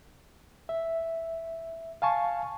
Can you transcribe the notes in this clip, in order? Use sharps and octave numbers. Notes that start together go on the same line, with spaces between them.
E5
F5 G#5 A5 C#6